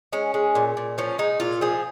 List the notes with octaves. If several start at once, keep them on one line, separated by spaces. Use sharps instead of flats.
G#3 C#4
G#3
A#2
A#2
F3 C#4
G#3 D#4
A#2 F4
F3 G#4